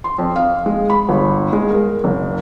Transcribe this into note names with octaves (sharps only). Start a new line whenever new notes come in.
C6
F2
F5
G#3
B5
G1
G#3
A#4
F#1